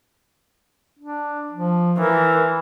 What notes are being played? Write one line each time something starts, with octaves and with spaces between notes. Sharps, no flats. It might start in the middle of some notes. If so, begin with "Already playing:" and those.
D4
F3
E3 A#4